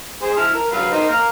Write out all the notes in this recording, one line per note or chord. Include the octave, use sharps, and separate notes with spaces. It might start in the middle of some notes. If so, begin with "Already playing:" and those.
G#4 C5
E4 A5 F6
A#4
F#3 B4 F5
D#4 A#4 C5
A#3 A#5 F6